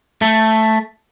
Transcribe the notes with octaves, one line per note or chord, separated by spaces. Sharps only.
A3